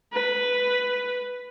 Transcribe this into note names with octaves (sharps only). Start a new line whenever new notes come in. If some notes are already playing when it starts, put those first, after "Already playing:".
B4